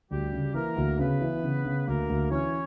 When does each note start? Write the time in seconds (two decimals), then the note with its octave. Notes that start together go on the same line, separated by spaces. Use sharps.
0.11 D2 G3 G4
0.33 C#3
0.54 E3 A#3 A#4
0.77 D2
0.99 C#3 B3 B4
1.21 E3
1.43 C#3
1.65 C#3
1.87 D2 A#3 A#4
2.09 D2
2.31 E3 C#4 C#5